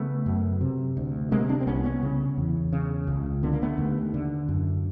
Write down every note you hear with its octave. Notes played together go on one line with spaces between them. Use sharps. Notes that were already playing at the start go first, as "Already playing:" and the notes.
Already playing: C#3 A3 B3
F#2
C3
D2
C3 G#3 A#3
C4 D4
C4
C2 B3 C#4
B3 C#4
C#3
E2
C#3
C#2
D3 B3
A#3
A3 B3
D#2
D3
F#2